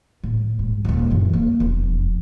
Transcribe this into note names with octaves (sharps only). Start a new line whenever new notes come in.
A2
G#2
D#1 D#2
F#2 E3
A#3
E1 F2